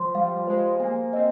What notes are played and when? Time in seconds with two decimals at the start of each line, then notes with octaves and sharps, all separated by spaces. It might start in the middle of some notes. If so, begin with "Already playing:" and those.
Already playing: F3 C5 C6
0.14 G3 F5
0.47 G#3 C5
0.80 A#3 G#5
1.13 C4 D#5